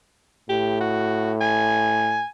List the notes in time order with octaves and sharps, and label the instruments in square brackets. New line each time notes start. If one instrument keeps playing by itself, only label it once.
[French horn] A2 [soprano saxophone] G4
[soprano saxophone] F#4
G#5